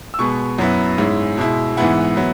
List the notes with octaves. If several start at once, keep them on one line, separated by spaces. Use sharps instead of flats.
E6
B2 G#3 B3 C#6
F#2 F#3 B3 E4
G#2 G#3 C#4 E4
B2 G#3 E4
G#2 E3 G#3 B3 E4 F#5
F#3 B3 E4